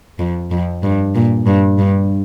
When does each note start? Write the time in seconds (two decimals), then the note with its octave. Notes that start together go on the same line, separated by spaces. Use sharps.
0.19 F2
0.51 F2
0.83 G2
1.15 A#2
1.47 G2
1.79 G2